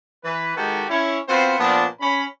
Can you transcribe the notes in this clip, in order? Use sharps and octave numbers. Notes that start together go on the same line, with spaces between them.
E3 B4
D#3 G#3 D#4 F#4 G4 A4
C#4 E4 C#5
B3 C4 F4 F#4 B4 C5
A#2 F3 B3 C4 D4
C#4 B5